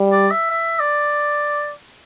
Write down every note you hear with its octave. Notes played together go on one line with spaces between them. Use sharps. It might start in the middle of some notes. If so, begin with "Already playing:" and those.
Already playing: G3
D5
E5
E5
D5